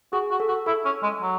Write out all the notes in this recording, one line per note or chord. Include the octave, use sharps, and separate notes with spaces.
F#4 G#4
F#4
A4
F#4
E4 A4
C#4
G#3
F#3